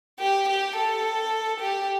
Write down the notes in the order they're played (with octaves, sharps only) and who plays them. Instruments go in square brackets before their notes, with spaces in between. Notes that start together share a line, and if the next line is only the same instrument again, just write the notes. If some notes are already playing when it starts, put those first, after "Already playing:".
[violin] G4
G4
A4
G4